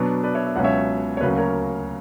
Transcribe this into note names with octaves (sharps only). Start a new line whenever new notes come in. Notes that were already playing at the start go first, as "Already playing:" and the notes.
Already playing: B2 F#3 B3 D4
B4 D5
C#5 E5
E5
C#2 B2 F#3 C#4 F#5
C#5 E5
C#5
D2 C#3 F#3 A#3 C#4 B4
A#4 C#5